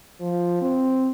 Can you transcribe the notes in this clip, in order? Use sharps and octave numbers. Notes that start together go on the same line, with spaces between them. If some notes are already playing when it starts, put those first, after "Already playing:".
F3
C4